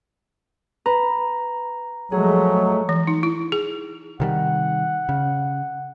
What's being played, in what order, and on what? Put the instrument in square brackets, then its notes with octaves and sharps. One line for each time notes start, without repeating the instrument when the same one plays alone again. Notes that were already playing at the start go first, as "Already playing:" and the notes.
[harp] B4 [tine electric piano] A#5
[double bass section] F3 G#3 A3 [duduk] F#3 [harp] G#4
[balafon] E3
D#4
E4
G#4
[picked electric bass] C3 D#3 G3 [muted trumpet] F#5
[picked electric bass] C#3